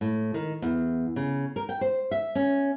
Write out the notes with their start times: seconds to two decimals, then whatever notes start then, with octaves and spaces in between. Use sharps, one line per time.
0.01 A2
0.34 D#3
0.62 E2
1.16 C#3
1.56 A#4
1.69 G5
1.81 C5
2.11 E5
2.35 C#4